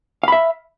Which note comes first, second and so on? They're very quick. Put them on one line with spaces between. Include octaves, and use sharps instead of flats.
F5 B5 E5